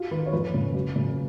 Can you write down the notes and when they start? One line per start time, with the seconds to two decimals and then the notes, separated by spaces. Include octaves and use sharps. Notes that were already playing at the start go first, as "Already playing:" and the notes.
Already playing: F4
0.11 D#3 B4
0.26 C#5
0.33 F2 B4
0.54 C#3
0.74 F#2
0.96 C#3